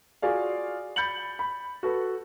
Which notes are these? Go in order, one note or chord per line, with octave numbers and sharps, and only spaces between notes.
F4 F#4 G#4 D5 F5
B5 G6 A6 C#7 F#7
B5
F#4 A4 B4